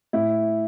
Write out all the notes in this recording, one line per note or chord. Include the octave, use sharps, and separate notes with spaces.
A2 E4